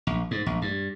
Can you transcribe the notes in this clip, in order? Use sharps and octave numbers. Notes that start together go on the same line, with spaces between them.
A#1
G#2
A#1
G2